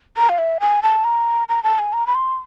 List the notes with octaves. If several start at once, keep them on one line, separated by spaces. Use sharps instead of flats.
A#5
F5
E5
G#5
A5
A#5
A#5
A5
G#5
A#5
B5
C6